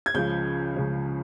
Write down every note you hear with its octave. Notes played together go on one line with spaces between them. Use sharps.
G#6
C#2 C#3 F3 G6
C#2 C#3 F3